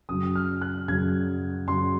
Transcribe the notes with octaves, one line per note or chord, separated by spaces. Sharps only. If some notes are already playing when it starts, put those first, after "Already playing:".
F#2 C#3 F#3 D#6
F6
F#6
F#2 C#3 F#3 G#6
F#2 C#3 F#3 C6